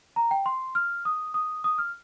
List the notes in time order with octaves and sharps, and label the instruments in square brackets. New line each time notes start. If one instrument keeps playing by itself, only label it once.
[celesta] A#5
G5
C6
F6
D#6
D#6
D#6
F6